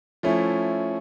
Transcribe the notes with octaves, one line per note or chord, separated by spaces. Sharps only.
F3 A3 C#4 E4